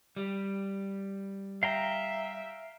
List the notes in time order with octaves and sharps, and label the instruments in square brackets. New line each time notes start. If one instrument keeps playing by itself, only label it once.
[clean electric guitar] G3
[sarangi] E5 [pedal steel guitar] F5 G5 A#5